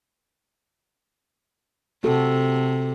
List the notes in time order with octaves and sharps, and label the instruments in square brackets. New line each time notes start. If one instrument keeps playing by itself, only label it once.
[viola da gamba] C3 [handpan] F#4 A4